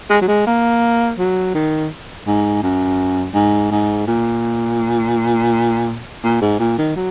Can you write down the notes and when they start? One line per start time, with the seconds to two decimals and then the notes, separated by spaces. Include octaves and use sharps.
0.10 G#3
0.21 F#3
0.28 G#3
0.46 A#3
1.19 F#3
1.55 D#3
2.27 G#2
2.63 F#2
3.35 G#2
3.71 G#2
4.07 A#2
6.24 A#2
6.42 G#2
6.59 A#2
6.78 D#3
6.96 F#3